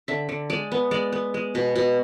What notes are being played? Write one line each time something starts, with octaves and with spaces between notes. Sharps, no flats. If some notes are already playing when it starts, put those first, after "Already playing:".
D3 E5
D3
G#3 D5
B3
G#3 D5
B3
G#3
B2
B2